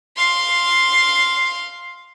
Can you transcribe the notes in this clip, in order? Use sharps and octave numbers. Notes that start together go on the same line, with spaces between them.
F5 C6